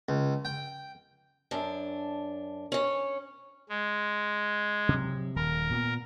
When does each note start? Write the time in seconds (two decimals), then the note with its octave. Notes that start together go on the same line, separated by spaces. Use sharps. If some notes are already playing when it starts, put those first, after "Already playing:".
0.09 C#2
0.45 G5
1.51 F#2 D4
2.72 C#4 C#5
3.69 G#3
4.89 C3 F#3
5.36 D#1 D#3 A#4
5.71 A#2 B3